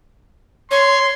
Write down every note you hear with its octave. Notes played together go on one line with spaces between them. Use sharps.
C#5 C6